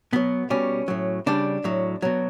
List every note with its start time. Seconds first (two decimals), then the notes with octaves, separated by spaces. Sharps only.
0.13 B2 F#3 B3
0.50 B2 G3 C#4
0.88 A2 F#3
1.26 C#3 G3 D4
1.64 A2 F#3
2.02 B2 F#3